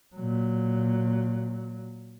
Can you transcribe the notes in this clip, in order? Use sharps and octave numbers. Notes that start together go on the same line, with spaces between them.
A#2 F#3